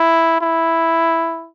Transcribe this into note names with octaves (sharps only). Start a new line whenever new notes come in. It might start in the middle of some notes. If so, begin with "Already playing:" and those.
Already playing: E4
E4